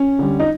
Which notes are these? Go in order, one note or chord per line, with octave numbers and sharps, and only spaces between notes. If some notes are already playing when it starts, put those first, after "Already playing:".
Already playing: C#4
D3 G3
D#4